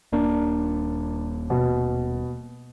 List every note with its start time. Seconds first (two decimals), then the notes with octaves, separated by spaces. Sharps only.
0.12 D#1 A#3 D4
1.50 B2